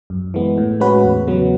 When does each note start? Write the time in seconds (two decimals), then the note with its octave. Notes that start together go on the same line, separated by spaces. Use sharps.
0.10 F#2
0.34 E3 G#3 B3
0.58 A2
0.80 G#3 C#4 F#4 B4
1.03 E2
1.27 C#3 F#3 B3